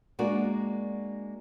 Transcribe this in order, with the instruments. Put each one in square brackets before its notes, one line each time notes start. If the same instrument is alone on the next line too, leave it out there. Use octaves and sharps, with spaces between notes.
[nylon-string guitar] G#3 A#3 D4 F#4 A#4 D5